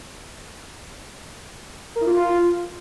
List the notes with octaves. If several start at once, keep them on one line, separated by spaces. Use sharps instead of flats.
A#4
E4
F4